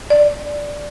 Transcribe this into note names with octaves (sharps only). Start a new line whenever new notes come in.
D5